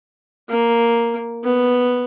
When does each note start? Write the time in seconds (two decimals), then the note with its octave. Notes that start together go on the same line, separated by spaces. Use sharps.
0.50 A#3
1.44 B3